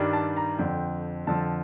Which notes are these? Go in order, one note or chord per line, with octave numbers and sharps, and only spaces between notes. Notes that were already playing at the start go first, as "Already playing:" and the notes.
Already playing: G2 D#3 G3 D4
A5
A#5
F2 D3 F3 G5
F2 D3 F3 A5